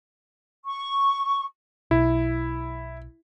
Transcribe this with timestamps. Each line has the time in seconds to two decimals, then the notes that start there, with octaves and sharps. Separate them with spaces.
0.66 C#6
1.91 B1 E4